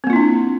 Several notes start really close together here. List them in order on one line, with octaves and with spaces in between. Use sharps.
C4 A#3 F4 E4 D4